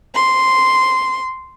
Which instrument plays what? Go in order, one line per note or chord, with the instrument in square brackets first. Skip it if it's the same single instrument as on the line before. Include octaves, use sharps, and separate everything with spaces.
[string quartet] C6